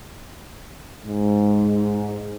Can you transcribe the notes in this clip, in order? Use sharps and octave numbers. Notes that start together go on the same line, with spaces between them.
G#2